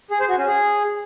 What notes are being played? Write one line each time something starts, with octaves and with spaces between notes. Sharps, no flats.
G#4
C5
F#4
C#4
G#4